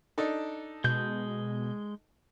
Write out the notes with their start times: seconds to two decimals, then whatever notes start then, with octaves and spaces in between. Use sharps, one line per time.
0.18 D4 D#4 A4
0.84 B2 G#3 G6